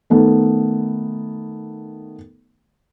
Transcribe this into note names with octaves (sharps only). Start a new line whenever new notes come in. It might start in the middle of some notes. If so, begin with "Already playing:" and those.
D#3 A3 B3